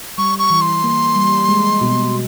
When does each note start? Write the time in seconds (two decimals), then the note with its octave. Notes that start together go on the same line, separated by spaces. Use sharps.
0.18 G3 C#6
0.39 C#6
0.50 E3
0.61 C6
0.83 A#3
1.16 G3
1.49 G#3
1.81 B2